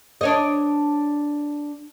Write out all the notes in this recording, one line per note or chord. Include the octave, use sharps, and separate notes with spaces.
D4 C#5 D#5